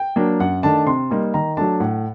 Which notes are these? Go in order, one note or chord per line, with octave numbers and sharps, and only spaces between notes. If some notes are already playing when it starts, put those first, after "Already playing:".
Already playing: G5
F#3 A#3 D4
F#2 F#5
D#3 A3 D4 A5
C3 C6
G3 A#3 D#4
D#3 A#5
F#3 A3 D4 A5
A2 F#5